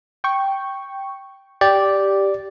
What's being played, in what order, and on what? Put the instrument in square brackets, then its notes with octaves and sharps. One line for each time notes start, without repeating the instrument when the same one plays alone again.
[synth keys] G5 C#6
[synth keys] G4 [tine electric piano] D5